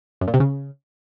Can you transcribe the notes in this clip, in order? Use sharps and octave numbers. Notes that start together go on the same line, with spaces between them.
F#2
A#2
C3
C#3